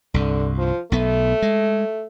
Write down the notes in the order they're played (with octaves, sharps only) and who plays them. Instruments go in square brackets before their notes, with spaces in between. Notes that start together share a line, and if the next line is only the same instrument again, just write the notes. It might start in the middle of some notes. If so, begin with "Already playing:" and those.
[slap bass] C2 G2 [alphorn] D3
[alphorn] F3
[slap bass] B1 B3 [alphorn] A3
[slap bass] G#3